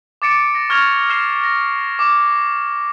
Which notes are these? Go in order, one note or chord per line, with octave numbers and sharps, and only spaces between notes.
D6 A6 C#7 D7
A#6
C#6 F6 G#6 A#6 F7
F6 C7 E7
A#6
D6